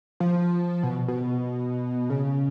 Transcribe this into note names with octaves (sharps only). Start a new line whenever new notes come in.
F3
B2
B2
C#3